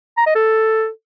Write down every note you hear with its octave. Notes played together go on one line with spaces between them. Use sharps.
A#5
D#5
A4